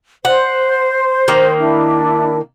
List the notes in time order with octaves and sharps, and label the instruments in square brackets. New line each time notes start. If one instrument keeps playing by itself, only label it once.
[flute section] C5 [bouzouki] F#5
[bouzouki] D#3 A#3
[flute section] D4 E4